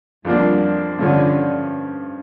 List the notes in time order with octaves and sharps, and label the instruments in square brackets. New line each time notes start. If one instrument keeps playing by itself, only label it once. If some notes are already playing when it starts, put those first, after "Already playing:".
[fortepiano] F2 D3 F3 A#3 D4 [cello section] G3
[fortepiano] G2 F3 C#4 [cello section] D3